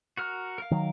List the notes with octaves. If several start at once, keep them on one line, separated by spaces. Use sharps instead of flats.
F#4 A#4 F6
A#4 F5
D#3 F#3